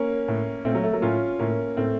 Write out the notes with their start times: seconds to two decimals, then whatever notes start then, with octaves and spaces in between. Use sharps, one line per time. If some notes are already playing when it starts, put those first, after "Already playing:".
Already playing: A#3 C#4
0.28 A2
0.65 A#2 A3 C4
0.75 F#3
0.84 A3
0.93 F#3 A#3
1.02 A2 C#4 F4
1.39 A2 A#3 C#4
1.77 A2 A3 C4